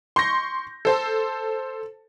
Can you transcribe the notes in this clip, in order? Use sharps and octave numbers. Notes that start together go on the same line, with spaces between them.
C6 C#6 G6 A#6
A4 C5 A5